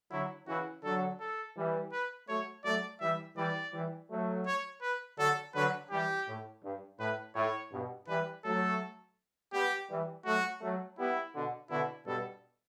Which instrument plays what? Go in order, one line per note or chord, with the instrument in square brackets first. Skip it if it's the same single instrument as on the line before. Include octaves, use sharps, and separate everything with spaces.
[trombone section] D3 F#3 [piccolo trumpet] E4
[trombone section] C#3 E3 [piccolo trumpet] F#4
[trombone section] D3 F#3 [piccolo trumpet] A4
[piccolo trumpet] A4
[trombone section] E3 G3
[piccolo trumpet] B4
[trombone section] F#3 A3 [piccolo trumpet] C#5
[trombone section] F#3 A3 [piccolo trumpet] D5
[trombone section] E3 G3 [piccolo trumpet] E5
[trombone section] E3 G3 [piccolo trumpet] D5
[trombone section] E3 G3
F#3 A3
[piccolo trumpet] C#5
B4
[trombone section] D3 F#3 [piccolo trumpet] A4
[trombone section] D3 F#3 [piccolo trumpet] B4
[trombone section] E3 G3 [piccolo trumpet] G4
[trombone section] A2
G2
[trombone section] A2 [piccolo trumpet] B4
[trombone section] A2 [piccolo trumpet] C#5
[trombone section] G2 B2
[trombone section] E3 G3 [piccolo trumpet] B4
[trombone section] F#3 A3 [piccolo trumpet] A4
[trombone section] G3 B3 [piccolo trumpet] G4
[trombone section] E3 G3
[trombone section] F#3 A3 [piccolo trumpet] F#4
[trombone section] F#3 A3
[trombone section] G3 B3 [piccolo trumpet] E4
[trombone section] B2 D3
[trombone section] B2 D3 [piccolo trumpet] E4
[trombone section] G2 B2 [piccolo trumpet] A4